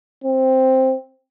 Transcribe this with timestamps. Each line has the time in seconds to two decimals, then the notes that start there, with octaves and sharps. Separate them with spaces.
0.24 C4